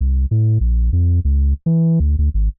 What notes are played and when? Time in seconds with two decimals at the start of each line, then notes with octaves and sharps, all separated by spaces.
0.01 C2
0.31 A2
0.61 A#1
0.93 F2
1.25 C#2
1.66 E3
2.00 D2
2.19 D2
2.34 G#1